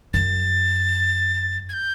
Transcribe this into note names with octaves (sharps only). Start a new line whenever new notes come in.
F#2 A6
G#6
G6